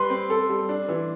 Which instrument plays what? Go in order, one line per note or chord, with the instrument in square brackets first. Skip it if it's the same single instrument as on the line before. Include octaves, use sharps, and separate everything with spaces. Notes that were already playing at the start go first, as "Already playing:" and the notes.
Already playing: [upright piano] G3 B4 [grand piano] C6
[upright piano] C4
A4
G3
D4
E3